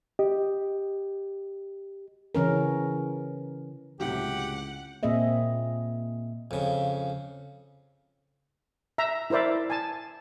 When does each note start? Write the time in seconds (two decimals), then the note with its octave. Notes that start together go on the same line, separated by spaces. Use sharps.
0.19 G4 D#5
2.35 C#3 E3 C#4 A#4
4.00 C#2 A2 C3 F#3 G4 F#5
5.03 A#2 A#3 C4 G#4 D#5 E5
6.51 F2 C#3
8.98 E5 A#5
9.30 E4 A#4 C5 D5 E5
9.70 G#5 A5